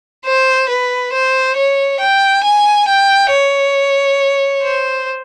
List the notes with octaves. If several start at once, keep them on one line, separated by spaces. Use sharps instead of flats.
C5
B4
C5
C#5
G5
G#5
G5
C#5
C5